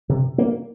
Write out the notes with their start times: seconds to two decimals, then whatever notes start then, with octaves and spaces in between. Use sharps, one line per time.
0.09 C3
0.38 A#3